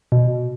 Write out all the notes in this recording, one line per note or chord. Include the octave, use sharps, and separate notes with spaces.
B2